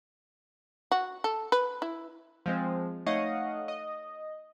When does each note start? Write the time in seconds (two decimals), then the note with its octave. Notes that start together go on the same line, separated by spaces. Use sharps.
0.92 F#4
1.24 A4
1.52 B4
1.82 E4
2.46 F3 G#3 C4
3.06 A3 D#4 C#5 D#5 F5 F#5
3.68 D#5